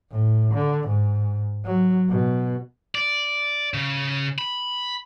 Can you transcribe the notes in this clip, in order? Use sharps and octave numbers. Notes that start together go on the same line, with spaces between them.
A2
D3
G#2
F#3
B2
D5
C#3
B5